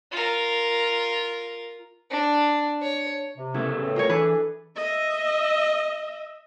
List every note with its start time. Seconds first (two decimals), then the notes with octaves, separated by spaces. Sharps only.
0.12 F4 A#4
2.11 D4
2.82 C#5
3.37 C3
3.54 C#3 A3 B3 E4
3.80 E2 A2 C4
3.96 F4 A#4 C#5
4.09 E3 D4 G#4 A4 B4
4.76 D#5 E5